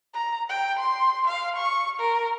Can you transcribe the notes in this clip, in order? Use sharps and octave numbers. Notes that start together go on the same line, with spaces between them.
A#5
G5
C6
F5
C#6
A#4